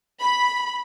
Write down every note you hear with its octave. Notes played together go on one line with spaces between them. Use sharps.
B5